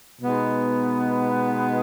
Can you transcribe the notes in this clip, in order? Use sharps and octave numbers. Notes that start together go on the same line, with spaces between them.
B2 G#3 B3 D#4